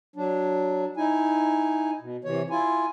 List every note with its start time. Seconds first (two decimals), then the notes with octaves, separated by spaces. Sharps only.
0.16 F#3 D4
0.97 D#4 E4 G#5
2.01 B2
2.25 C3 E3 C#5
2.50 E4 F4 G#5